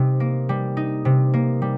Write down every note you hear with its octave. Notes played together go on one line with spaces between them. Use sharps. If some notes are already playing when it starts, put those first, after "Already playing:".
Already playing: C3 G3 D#4
A#3
G3
D#4
C3
A#3
G3